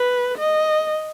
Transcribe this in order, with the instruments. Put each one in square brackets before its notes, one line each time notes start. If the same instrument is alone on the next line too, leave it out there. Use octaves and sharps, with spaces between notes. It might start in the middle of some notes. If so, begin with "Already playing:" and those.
Already playing: [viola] B4
D#5